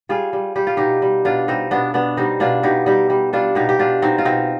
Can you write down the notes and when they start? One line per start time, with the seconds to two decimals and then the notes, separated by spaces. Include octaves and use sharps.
0.09 G3 F4 G#4
0.33 G3
0.56 G3 G4
0.67 F4
0.77 B2 D#4 G4
1.02 G3
1.25 B2 D4 F4
1.48 G3 C4 D#4
1.71 B2 B3 D4
1.94 B2 B3 D4
2.17 G3 C4 D#4
2.40 B2 D4 F4
2.63 B2 D#4 G4
2.86 G3 D#4 G4
3.10 G3
3.33 G3 D4 F4
3.55 B2 D#4 G4
3.69 G4
3.79 B2 D4 F4
4.02 B2 C4 D#4
4.18 F4
4.25 B2 C4 D#4